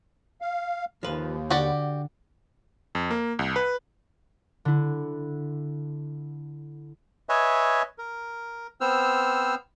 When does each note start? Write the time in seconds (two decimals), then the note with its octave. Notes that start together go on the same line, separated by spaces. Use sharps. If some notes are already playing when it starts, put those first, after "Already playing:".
0.41 F5
1.03 D#2 F3 B4
1.50 D3 F#4 G4 D5
2.95 F2
3.11 A#3
3.39 C2
3.56 B4
4.65 D3 E4
7.29 B4 C#5 D#5 E5 G#5
7.98 A#4
8.81 B3 C4 C5 E6 F6